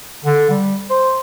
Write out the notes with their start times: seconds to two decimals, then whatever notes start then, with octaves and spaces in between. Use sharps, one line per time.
0.24 D3
0.50 G3
0.90 C5